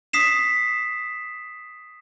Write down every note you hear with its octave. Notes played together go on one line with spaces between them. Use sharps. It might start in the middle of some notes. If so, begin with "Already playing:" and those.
D#6 B6 C7 E7